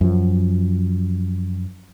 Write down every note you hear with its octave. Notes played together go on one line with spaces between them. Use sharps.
F#2 F3